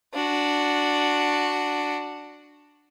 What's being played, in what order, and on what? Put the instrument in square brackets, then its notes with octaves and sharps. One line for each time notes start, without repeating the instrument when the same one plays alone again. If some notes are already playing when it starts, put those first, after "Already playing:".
[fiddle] D4 F#4